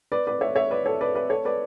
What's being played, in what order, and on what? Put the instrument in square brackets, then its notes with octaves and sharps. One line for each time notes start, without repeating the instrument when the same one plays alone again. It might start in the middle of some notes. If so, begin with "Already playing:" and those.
[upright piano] B4 D5
B4 D5
C#5 E5
C#5 E5
B4 D5
A4 C#5
B4 D5
B4 D5
A4 C#5
B4 D5